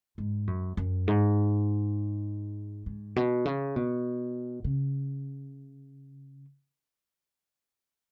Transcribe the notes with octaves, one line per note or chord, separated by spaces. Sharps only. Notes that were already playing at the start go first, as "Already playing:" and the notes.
G#2
F#2
F#2
G#2
G#2
B2
C#3
B2
C#3